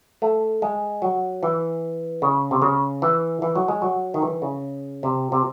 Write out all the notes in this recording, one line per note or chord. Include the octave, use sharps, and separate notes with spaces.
A3
G#3
F#3
E3
C#3
C3
C#3
E3
E3
F#3
G#3
F#3
D#3
E3
C#3
C3
C3